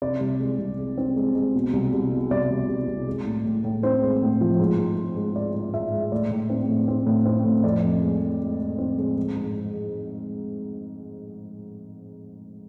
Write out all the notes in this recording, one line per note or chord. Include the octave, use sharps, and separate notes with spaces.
C3 D5
C2
G#3
C2
G#3
C4
G#3
G#3
B2
C2
C2
B2
C2 D5
C2
C2
C2
G#3
A2
A2
A2
C4 C5
G#3
A2
F3
G#2
G#2
G#2
G#2
G#2 D5
G#2
G#2 E5
G#3
A2 D5
A2
C4
A2
C4
A2
C4
A2
F2 D5
F2
G#3
G#3
G#3
G#3
C4
G#3
G#3
G#2